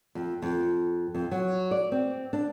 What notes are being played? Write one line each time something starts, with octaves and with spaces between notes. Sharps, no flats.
F2
F2
F2
F#3
D5
C4
D4